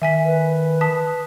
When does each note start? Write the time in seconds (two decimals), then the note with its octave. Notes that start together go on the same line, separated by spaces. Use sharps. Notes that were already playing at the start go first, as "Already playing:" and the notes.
0.02 D#3 E5 G#5 B6
0.25 B4
0.81 A5 D#6 B6